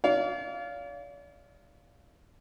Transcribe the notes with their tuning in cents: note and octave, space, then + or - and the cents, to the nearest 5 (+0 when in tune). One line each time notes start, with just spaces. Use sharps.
D#4 +0 D5 -45 F5 +0